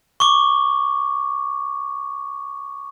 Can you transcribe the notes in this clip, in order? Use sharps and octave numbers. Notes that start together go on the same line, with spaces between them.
C#6 D6